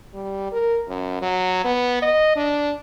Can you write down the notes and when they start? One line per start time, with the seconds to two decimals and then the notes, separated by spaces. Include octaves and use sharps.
0.14 G3
0.52 A#4
0.88 F#2
1.22 F#3
1.64 B3
2.02 D#5
2.36 D4